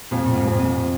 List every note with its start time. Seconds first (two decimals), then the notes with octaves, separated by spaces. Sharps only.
0.11 F2 A#2
0.26 A#2
0.35 G#2
0.47 F2
0.60 A#2